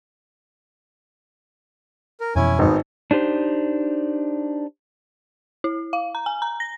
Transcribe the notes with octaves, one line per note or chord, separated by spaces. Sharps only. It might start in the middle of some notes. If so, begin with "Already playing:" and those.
A#4
F2 B2 E3 C#4 E4 G#5
G#1 B3 D#4
D4 D#4 G4 C5
E4
F5
A#5
G#5
A#5
A#6